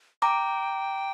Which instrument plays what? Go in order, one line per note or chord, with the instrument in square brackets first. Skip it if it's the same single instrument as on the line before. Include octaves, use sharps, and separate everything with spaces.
[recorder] G5 [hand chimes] A#5 D6